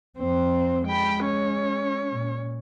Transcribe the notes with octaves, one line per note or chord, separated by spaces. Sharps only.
F2 C4 C5
G#3 G5 B5
C#4 C#5
A#2